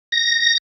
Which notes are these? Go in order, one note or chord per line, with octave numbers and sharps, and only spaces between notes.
A#6